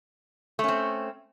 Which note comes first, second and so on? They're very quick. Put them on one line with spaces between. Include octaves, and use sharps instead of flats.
A3 C#4 C4